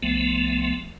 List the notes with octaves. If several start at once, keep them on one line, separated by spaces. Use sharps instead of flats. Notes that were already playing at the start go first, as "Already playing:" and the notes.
C2 F3 A3 B3